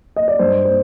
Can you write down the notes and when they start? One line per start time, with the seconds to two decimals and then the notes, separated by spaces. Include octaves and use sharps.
0.16 D#5
0.28 D5
0.39 G2 C5
0.65 C5